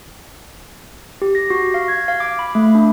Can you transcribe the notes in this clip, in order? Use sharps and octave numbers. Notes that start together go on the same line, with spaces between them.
G4
A#6
F#4
F5
G#6
F5
D6
B5
A3
D4